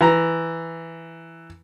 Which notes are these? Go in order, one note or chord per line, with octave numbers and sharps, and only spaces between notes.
E3 A#5